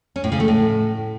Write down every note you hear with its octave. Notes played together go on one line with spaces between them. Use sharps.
C#4
A2
C#3
A3
A2